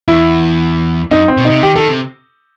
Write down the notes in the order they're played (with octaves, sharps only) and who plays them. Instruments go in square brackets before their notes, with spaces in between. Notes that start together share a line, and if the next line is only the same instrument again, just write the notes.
[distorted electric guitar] E2 [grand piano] E4
[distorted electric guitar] F#2 [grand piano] D#4
[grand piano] C4
[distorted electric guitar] B2
[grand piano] D#4
[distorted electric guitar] C3
[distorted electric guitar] D#3 [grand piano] G4
[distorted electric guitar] D#3 [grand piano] A4
[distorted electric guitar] C3